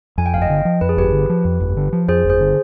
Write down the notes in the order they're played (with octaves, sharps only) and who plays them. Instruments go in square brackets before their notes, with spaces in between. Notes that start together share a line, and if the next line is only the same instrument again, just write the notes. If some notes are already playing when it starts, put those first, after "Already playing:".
[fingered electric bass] F2 [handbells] G#5
[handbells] G5
[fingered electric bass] G1 [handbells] F5
[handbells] D#5 G5
[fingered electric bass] D3
F3
[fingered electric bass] F2 [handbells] B4
[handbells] G#4
[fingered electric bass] G1 [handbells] G4 B4
[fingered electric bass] D3
F3
F2
G1
D3
F3
[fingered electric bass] F2 [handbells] G#4 C5
[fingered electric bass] G1
[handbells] G#4 C5
[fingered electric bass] D3